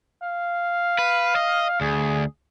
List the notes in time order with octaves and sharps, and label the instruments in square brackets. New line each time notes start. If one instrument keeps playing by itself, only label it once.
[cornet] F5
[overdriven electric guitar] B4
D#5
[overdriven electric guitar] D2 [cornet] G#4